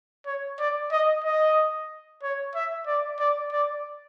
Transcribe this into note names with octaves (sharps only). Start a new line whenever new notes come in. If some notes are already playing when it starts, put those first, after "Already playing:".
C#5
D5
D#5
D#5
C#5
E5
D5
D5
D5